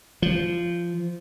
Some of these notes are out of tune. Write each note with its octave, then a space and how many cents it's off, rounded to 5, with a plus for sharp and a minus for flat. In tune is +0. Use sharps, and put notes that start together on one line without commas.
F3 -15